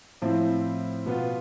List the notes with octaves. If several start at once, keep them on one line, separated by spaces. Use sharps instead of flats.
A2 F3 C4 E4
B2 B3 F4